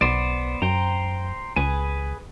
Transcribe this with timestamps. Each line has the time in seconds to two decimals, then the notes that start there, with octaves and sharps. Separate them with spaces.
0.01 B1 B3 C5 D5
0.62 F#2 C5 G5 A#5
1.56 C#2 G#4 B4 G#5